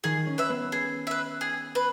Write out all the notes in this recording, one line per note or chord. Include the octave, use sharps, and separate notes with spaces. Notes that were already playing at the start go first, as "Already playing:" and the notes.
D#3 G#4
C#4
B4 E5
B3
G#4
B4 E5
G#4
B4